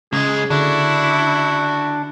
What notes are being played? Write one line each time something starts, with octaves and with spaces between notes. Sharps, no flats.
C#2 C#3 G#3 G#4
D3 D4 E4 F#4